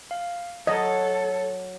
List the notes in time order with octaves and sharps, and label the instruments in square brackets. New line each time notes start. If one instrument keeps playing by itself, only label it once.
[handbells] F5
[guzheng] F#3 [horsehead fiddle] A4 [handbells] C#5 [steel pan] D#5